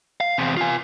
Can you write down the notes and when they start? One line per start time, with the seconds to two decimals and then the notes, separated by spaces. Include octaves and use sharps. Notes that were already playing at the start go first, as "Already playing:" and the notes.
0.21 F5
0.38 E2 C3
0.57 F4 G#5